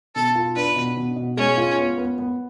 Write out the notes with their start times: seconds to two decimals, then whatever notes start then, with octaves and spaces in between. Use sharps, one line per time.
0.15 B2 A4
0.35 F4
0.56 D4 B4
0.76 B2
0.97 B2
1.16 B2
1.37 G#3 C#4
1.57 F4
1.78 B3
1.98 B3
2.18 B3